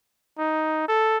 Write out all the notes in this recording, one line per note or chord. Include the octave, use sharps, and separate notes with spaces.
D#4
A4